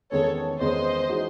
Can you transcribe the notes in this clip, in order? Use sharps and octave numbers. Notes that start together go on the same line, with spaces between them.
E2 D#3 G#3 C#4 A4 C#5
E2 D#3 G#3 C#4 C5 D#5
E3 G#3 D#4 F#4